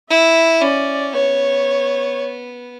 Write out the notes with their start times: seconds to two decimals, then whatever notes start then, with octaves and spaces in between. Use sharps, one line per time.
0.10 E4 E5
0.61 C#4 D5
1.13 B3 C#5